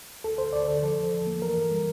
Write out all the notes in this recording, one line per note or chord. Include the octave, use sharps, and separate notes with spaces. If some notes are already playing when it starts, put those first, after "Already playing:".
D2 A4
D2 C5
D2 D5
D3 A4
F3 A4
E2
F3
A#3
E3 A#4
G2
G3